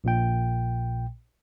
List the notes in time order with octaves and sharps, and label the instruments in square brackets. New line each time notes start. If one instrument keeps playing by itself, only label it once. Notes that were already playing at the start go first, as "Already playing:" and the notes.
[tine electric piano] A#1 A#2 G5